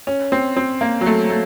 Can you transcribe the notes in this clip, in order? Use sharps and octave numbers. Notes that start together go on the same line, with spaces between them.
C#4
C4
C4
A#3
F#3
A3
A3